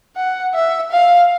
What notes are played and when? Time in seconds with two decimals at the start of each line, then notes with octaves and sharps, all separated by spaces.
0.16 F#5
0.54 E5
0.91 F5